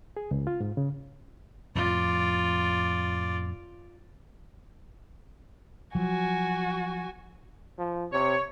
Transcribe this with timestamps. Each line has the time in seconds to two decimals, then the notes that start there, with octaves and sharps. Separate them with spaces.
0.17 G#4
0.31 C#2
0.47 F4
0.60 G#2
0.77 C#3
1.75 F2 A2 F3 F4 D5
5.95 F3 F#3 F#4 G#5
7.78 F3
8.12 C3 C#5